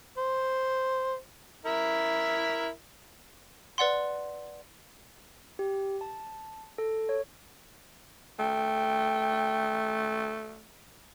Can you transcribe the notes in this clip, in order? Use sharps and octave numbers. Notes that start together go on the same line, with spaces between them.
C5
E4 A#4 E5
B4 D5 F#5 C6
G4
A5
A4
C#5
A3 G5